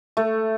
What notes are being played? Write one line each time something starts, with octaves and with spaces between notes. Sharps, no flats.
A3